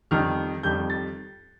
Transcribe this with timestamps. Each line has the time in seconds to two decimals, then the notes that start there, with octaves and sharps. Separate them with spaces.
0.11 F2 D#3 G3 F6
0.63 F2 D#3 G3 G6
0.90 A6